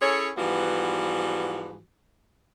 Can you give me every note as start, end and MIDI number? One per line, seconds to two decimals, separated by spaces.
0.01 0.29 61
0.01 0.29 64
0.01 0.29 68
0.01 0.29 69
0.01 0.29 73
0.37 1.79 44
0.37 1.79 52
0.37 1.79 53
0.37 1.79 55
0.37 1.79 59
0.37 1.79 66